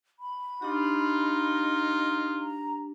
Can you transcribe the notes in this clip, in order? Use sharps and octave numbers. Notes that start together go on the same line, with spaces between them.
B5
D4 D#4 F4 G4
A#5